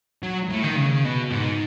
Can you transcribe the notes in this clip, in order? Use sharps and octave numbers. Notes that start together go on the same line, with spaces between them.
F#3
A2
D#3
C#3
B2
G#2